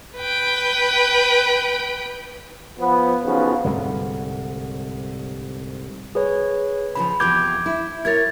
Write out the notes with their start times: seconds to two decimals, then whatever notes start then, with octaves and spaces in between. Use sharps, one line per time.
0.16 B4 G5
2.79 F3 B3
3.24 B1 C#3 F3 B3
3.65 C2 G#2 D3
6.15 G#4 B4 C#5
6.95 C#3 E3 F3 B5
7.20 E2 C3 F3 D6 G6 G#6
7.66 E4
8.05 E4 A#4 C#5 G#6 A6